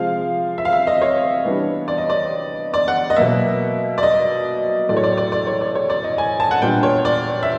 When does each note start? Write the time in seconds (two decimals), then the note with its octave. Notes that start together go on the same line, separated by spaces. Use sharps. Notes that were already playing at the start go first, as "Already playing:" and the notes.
Already playing: C3 F3 G#3 F5
0.58 E5
0.65 F5
0.73 E5
0.87 D#5
1.01 C#5
1.44 E3 G3 B3 D4
1.88 D5
1.98 D#5
2.10 D5
2.74 D5
2.88 F#5
3.10 D#5
3.16 B2 F#3 A#3 E5
3.98 D5
4.03 D#5
4.89 A2 F#3 A3 D5
4.97 C#5
5.04 D5
5.17 D5
5.32 D5
5.47 C#5
5.61 D5
5.75 C#5
5.90 D5
6.04 D#5
6.18 G#5
6.40 A5
6.51 F#5
6.62 A#2 G3 B3 D4 G5
6.83 C#5
7.05 D5
7.43 E5